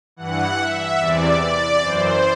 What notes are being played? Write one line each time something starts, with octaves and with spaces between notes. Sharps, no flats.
G2 E3 F#5
E5
E2 C3 E3 D5
D5
F#2 E3 C5